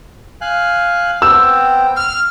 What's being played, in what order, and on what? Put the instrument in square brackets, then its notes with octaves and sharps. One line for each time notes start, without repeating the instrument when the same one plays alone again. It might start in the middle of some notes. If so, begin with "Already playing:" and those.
[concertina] F5 G#5 F#6
[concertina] B3 C4 G5 [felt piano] E6
[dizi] F6